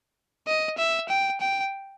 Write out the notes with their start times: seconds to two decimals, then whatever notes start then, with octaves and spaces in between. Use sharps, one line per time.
0.47 D#5
0.78 E5
1.09 G5
1.40 G5